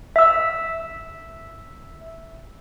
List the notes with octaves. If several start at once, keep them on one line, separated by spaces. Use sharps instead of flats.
E5 E6